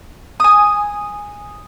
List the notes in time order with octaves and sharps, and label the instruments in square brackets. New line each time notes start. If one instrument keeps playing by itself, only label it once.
[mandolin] G#5 D#6